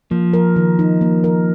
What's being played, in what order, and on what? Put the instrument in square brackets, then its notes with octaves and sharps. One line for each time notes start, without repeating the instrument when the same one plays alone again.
[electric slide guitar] F3 [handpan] A#3
[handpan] A#4
D#3
D#4
A#3
A#4